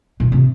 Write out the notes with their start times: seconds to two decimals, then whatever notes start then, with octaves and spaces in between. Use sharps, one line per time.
0.20 A#2
0.32 C3